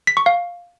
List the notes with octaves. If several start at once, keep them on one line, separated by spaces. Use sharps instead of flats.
B6
C#6
F5